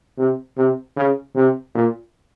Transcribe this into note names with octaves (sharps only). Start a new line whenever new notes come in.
C3
C3
C#3
C3
A#2